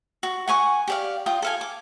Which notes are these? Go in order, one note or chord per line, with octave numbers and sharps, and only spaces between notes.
F#4
F#5 G#5 C#6 D6
G4 D5 F5
F4 G5 D#6
A4 F5 G#5
D6